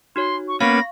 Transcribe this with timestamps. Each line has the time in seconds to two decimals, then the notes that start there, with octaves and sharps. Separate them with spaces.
0.16 D#4 F#4 C#5 C6
0.48 C#6
0.61 A#3 B3 C#4 F5 B5 C#6 A#6